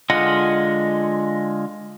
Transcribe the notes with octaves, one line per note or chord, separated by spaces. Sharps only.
D3 G#3 F4 D#5 F#5